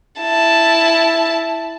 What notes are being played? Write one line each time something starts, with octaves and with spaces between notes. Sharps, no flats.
E4 A5